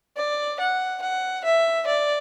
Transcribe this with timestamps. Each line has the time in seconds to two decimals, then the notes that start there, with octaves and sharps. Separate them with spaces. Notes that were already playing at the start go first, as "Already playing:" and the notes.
0.17 D5
0.60 F#5
1.02 F#5
1.45 E5
1.87 D5